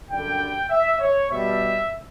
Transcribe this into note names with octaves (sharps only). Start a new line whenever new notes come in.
F#2 D3 G3 G5
E5
C#5
B2 G3 E5